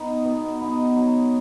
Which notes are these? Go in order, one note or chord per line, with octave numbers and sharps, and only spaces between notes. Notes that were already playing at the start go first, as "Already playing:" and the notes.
Already playing: B3 D#4
B2
B3 D#4
F#3